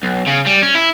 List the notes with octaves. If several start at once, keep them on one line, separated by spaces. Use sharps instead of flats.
B1
C#3
G3
C#4
E4